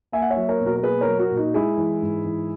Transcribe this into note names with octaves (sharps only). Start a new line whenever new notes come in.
A#3 E5 G#5
F#5
C#5 E5
F#3
A#4 C#5
B2
F#4 A#4
A#4
A#3 G#4 B4
A#4 C#5
F#3
F#4 A#4
A#2
D#4 F#4
G#3 E4 G#4
E3
G#2
E3